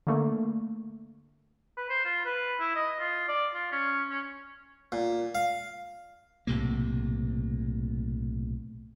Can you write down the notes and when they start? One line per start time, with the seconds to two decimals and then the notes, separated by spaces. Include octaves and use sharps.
0.07 D3 A3 A#3
1.77 B4
1.90 C5
2.05 F4
2.25 B4
2.60 E4
2.75 D#5
3.00 F4
3.28 D5
3.54 F4
3.72 C#4
4.10 C#4
4.92 A#2
5.35 F5
6.47 B1 A2 C3 A#3